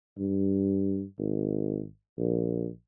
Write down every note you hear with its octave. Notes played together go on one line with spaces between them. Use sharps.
G2
G#1
A#1